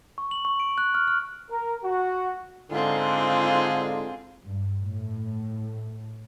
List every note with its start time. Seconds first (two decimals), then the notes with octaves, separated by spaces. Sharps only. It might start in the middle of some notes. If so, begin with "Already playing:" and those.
0.18 C#6
0.31 F#7
0.45 C#6
0.60 D7
0.78 F#6
0.95 F6
1.07 F6
1.50 A#4
1.83 F#4
2.71 G#2 D3 C4 F4 G#4
4.44 G2
4.81 A2